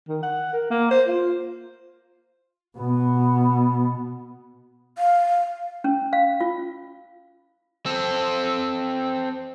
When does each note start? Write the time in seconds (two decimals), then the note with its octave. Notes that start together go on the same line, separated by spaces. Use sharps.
0.08 D#3
0.23 F#5
0.53 A#4
0.70 A#3
0.91 C5
1.07 F4
2.78 B2 B3
4.98 F5
5.84 C#4
6.13 F5
6.40 F4
7.86 C4 A4